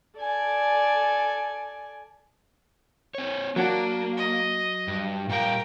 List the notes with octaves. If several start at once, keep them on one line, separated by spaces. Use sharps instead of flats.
A4 D5 G#5
C4 C#5
F#3 A#3 D4 F#4
D#5
G2
A#2 G3 A#4 F5 G5